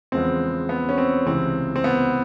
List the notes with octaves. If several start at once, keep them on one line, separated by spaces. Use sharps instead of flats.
E2 C#3 F3 G#3 B3 C4
B3
C#4
C4
C#2 C3 E3 G#3 C4
C4
B3